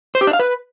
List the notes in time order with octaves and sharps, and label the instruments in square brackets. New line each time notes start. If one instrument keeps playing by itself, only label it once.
[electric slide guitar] C5
G4
D4
F5
B4